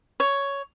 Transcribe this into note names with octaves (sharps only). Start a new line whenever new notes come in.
C#5